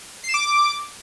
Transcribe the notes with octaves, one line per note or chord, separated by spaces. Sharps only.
C7
E7
D6